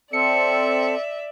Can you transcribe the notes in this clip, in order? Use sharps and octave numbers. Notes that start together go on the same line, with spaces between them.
C4 A4 D5 E5 C#7